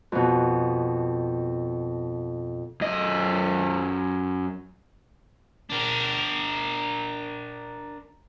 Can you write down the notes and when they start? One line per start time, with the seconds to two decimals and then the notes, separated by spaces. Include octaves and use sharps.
0.12 F2 B2
2.81 F#2 D#5
5.70 D4 A#4